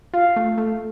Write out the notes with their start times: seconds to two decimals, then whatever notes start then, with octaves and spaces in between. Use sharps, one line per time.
0.14 F4 F5
0.36 A3
0.58 A3